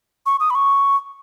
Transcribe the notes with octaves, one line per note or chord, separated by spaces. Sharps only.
C#6
D#6
B5
C#6